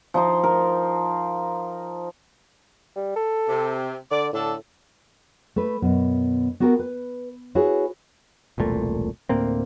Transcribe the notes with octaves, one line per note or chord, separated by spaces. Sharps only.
F3 D#4 C5
A#4
G3
A4
C3
D3 D5
A2 D3 D4 A4
A3 B4
F#2 B2 B3
B3 F#4 G4 A#4 G5
B4
E4 F#4 G#4 B4 C#5
E1 C2 A#2 A3
D2 A2 A#3 C4